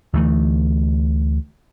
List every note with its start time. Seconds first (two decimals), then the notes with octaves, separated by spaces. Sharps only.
0.13 D2 E3 A3